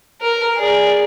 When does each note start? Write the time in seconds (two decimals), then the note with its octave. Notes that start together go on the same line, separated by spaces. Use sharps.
0.21 A#4
0.56 G#4 D5